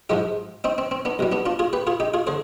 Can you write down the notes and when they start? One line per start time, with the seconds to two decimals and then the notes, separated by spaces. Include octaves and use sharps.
0.10 G#2 F3 G#3 D#4 G4
0.64 C4 D#4
0.78 C4
0.91 C4
1.05 B3 D4
1.19 C2 B2 G3
1.32 B3 D4
1.46 D4 F4
1.59 F4 G#4
1.73 G4 B4
1.87 F4 G#4
2.00 D#4 G4
2.14 F4 G#4
2.27 D3 G#4 C5